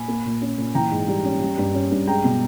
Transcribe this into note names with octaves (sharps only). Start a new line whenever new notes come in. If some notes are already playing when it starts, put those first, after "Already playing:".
Already playing: A#2 G#5 B5
A#3
A#2
C#4
A#2
E3 G5 A#5
G#2
G3
C#4
G3
G2
C#4
G2
G#3 G5 A#5
B2